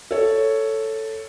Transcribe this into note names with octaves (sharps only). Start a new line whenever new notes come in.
A4 C#5